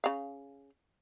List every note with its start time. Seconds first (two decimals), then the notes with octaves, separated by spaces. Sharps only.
0.04 C#3 F5